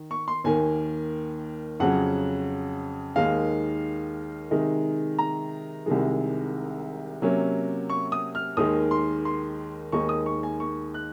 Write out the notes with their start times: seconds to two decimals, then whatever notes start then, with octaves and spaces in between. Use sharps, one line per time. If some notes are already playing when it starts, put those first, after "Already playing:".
Already playing: D#3
0.11 C#6
0.28 C6
0.44 D#2 D#3 A#3 G#5
1.80 F2 C#3 F#3 C#4 F#5
3.16 D#2 D#3 G#3 D#4 F5
4.51 C3 D#3 G#3 D#4
5.19 A#5
5.86 C2 C3 D#3 G#3
7.22 C3 F#3 A#3 C#4
7.90 C#6
8.12 D#6
8.35 F6
8.57 D#2 D#3 G#3 D#4 D#6
8.91 C6
9.25 C6
9.92 D#2 D#3 G#3 D#4 C#6
10.09 D#6
10.26 C#6
10.43 G#5
10.60 C#6
10.94 F#6